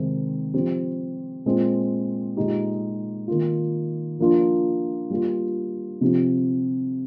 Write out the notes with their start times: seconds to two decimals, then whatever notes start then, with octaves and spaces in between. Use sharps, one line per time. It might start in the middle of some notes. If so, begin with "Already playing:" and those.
Already playing: C3 D#3 G#3 C4
0.54 F3 C4 G4
1.46 A#2 G#3 C4
2.37 A#2 G#3 D#4 G4
3.28 D#3 A#3 F4
4.19 F3 A#3 D4 F4
5.10 G3 A#3 F4
6.01 C3 F3 C4 G4